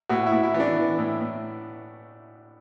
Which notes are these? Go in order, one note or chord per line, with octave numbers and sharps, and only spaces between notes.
A2 F#4
E4
A2
E4
E3 B3
D4
E3
A2
A2